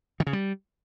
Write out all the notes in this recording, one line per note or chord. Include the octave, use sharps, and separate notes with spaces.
D#3
C#3
G3